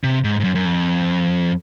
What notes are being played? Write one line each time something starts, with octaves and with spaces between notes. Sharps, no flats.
C3
G#2
G#2
F#2
F#2
F2